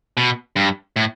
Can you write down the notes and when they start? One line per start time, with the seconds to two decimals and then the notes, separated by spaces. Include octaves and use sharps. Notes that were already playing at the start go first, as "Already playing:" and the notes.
0.17 B2
0.56 G2
0.96 A2